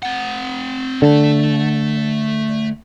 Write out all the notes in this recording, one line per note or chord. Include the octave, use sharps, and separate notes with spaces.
C4 F#5
D3 A3 A5